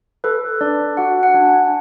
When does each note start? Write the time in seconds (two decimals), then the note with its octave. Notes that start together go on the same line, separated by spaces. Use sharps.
0.24 A4 B4
0.61 D4 D5
0.97 F#4 F#5
1.23 F#5
1.34 D4
1.47 G#5